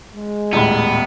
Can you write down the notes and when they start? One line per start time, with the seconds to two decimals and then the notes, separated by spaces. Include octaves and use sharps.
0.14 G#3
0.53 D#1 A2 B3